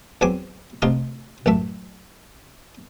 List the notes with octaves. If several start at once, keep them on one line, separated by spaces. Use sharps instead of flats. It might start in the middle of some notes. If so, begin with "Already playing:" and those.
E2 F#3 C4 G#5 D6
D2 C3 F4 D#5 F5 A#5
A1 F#2 A3 E5